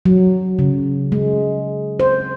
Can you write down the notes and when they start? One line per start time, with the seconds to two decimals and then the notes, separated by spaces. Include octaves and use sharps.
0.06 F#3
0.59 C#3
1.12 G#3
2.00 C5